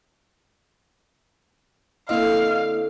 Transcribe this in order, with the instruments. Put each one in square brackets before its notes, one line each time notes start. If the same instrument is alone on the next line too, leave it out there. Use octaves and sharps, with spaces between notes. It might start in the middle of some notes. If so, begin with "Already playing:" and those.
[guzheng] D3 C4 [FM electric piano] A#3 E4 D#5 [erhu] F5